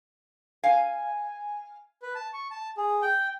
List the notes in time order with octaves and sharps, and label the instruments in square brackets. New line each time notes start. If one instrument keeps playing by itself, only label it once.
[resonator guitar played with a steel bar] F5 [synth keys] G#5
[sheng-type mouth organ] B4
A5
C#6
A5
G#4
G5